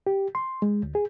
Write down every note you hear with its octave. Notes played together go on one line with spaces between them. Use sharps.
G4
C6
G#3
D2
G#4